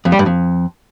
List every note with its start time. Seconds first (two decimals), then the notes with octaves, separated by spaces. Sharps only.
0.05 F2
0.12 G3
0.19 G2
0.26 F2